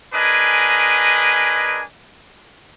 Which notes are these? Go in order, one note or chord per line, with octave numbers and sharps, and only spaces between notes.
D4 G#4 A#4 B4 D#5 G#5